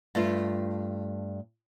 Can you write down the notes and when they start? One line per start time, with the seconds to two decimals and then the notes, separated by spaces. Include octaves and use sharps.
0.15 G2 A3 F4